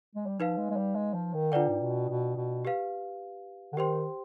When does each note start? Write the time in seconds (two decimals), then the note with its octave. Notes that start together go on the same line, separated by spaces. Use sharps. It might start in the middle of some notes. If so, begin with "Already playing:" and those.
0.15 G#3
0.27 G3
0.39 F3 D#4 B4 F5
0.58 G#3
0.71 G#3
0.76 G3
0.95 G#3
1.14 F3
1.34 D#3
1.52 D3 D4 F4 B4 D5 G5
1.68 G#2
1.81 B2
2.09 B2
2.36 B2
2.65 G4 B4 F5
3.72 D3
3.77 D#3 G4 C5 G5 C6